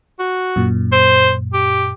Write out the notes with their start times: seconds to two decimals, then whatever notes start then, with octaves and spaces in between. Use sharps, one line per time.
0.19 F#4
0.56 F#2 A#2
0.92 C5
1.54 G4